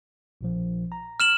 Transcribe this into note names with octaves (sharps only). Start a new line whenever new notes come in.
A#1 A#2 F3
A#5
F6 E7 F#7